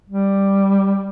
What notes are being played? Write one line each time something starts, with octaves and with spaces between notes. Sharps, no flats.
G3